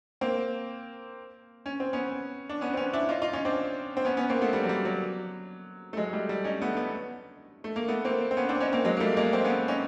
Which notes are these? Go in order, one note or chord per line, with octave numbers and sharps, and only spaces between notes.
A#3 C4
C#4
C4
B3 C#4
D4
B3 C#4
C4
B3 C#4
D4 E4
D#4 F4
D#4 F4
C#4 D#4
C4 D4
C4
B3 C#4
B3 C#4
A#3 C4
A3 B3
G3 A3
F#3
G3
F#3
A3
F#3 G#3
G3 A3
G3 A3
C#4 D#4
A3 B3
A3 B3
A3
A#3
A3 B3
A#3 C4
C4
B3 C#4
C4 D4
C#4 D#4
A#3 C4
F#3 G#3
A#3
G3 A3
G#3 A#3
A#3 C4
B3 C#4
C#4 D#4